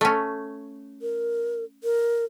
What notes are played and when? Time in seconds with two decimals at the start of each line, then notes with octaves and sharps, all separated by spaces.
0.01 A3 C#4
1.02 A#4
1.84 A#4